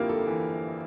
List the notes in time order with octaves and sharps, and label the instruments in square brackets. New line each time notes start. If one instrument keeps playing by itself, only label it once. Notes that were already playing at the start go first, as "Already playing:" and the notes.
Already playing: [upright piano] G1 F2 A#3 [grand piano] E4 F4 G4 A#4
[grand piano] A4
[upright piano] E3